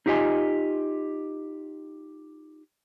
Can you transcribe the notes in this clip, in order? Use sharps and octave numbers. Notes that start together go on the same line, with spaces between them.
D#4 F4 G4 B4 D#5 G#5